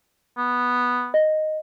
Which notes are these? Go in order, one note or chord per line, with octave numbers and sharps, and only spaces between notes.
B3
D#5